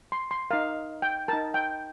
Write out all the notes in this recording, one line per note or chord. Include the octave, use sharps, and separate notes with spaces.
C6
C6
D#4 A#4 F5
G5
D#4 A#4 A5
G5